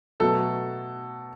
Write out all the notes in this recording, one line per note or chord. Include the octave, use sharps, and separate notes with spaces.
B2 F#3 A3 A4